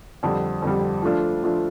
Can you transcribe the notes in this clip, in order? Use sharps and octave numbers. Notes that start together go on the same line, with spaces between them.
F2 D3 G3
F2 D3 G3
F3 A3 D4 F4
F3 A3 D4 F4